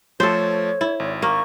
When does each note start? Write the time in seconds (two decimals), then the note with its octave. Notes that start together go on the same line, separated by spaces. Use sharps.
0.20 F3 A3 A4 C5 C#5
0.81 E4
1.00 G#1
1.22 A#3 C#6